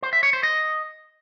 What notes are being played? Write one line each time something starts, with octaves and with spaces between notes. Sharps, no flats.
C5
E5
C#5
C5
D#5